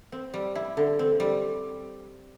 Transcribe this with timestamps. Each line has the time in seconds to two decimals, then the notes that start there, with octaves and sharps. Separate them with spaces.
0.12 C4
0.34 G3
0.55 E4
0.77 D3
0.99 C4
1.20 G3